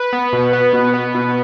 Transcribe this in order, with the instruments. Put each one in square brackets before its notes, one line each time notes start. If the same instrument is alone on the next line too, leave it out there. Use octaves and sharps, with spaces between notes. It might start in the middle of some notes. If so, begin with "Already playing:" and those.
Already playing: [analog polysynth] B4
B3
B2
B3
B2
B3
B2